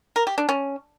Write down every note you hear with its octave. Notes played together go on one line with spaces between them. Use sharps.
A#4
G4
D4
C#4